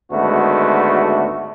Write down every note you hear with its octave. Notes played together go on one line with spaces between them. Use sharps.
G#1 D2 G#3 A3 B3 F#4